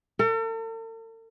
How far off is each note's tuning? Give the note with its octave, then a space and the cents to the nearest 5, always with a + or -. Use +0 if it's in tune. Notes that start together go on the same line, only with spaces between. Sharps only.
A4 +45